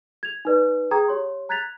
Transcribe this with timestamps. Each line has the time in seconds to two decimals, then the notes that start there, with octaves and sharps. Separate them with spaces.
0.23 G#6 F7
0.45 D#4 B4 D5
0.91 G#4 G5 A#5 D#6 G#6
1.08 G4 C#5 C6
1.49 A#5 F#6 G#6 A6 B6 F7